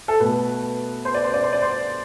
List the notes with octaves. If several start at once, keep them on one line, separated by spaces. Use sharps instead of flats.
A4
B2 A3 B4
C5
D5
C5
D5
C5
D5
C5